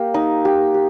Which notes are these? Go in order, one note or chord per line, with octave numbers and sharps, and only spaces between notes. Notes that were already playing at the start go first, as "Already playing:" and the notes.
Already playing: A#3 G4
D#4
G4
G4